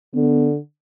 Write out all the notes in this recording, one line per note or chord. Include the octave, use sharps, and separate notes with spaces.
D3 B3